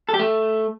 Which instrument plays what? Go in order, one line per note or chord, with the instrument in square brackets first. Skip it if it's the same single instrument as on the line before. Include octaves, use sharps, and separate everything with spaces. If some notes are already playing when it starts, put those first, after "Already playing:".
[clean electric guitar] A4
G4
A3